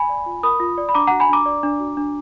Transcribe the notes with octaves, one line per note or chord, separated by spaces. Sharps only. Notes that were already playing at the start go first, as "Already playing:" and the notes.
Already playing: G#5 B5
D5
F4
A#4 B5 D#6
F4
D5
B5
D4 A#5 D6
F#4 F#5 A#5
G#5 B5
D4 A#5 D6
D5
D4
F#4
D4